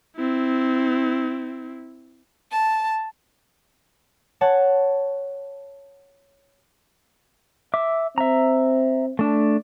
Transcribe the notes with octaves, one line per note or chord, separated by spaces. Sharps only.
C4 E4
A5
C#5 F#5 A5
E5 D6
C4 E5 A#5
A3 D4